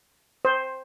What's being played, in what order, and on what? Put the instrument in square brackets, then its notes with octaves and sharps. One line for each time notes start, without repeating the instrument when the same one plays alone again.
[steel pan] C5